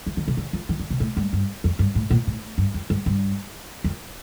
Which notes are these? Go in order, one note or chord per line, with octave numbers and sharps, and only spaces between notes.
E3
D3
C3
D3
F3
E3
D3
C3
A2
G2
G2
F2
G2
A2
A#2
A2
G2
F2
G2
G2
F2